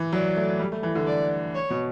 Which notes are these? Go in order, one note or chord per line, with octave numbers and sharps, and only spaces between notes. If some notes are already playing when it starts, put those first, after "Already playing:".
Already playing: E3
F#3 D5
A3
G3
A3
E3
D3
D5
C#5
B2